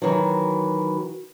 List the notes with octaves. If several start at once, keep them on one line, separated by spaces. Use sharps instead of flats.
D#3 E3 F#3